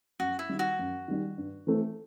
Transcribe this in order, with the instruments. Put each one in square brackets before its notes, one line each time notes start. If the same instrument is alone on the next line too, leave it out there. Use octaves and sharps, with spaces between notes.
[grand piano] F#2 [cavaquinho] F#4
[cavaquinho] E4
[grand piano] D#3 G3
[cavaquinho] F#4
[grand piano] F#2
D#3 G3
G2
E3 A3 C4